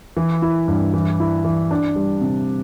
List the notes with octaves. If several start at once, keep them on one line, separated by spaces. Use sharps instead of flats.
E3
E4
G2
E3
E4
E3
D4
G3
C3